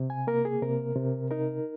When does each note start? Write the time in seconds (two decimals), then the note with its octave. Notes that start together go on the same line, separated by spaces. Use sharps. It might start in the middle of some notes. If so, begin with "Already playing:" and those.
Already playing: C3
0.10 G#5
0.27 A#3 A#4
0.45 G#4
0.62 C3 A#4
0.96 C3
1.31 D#4 A#4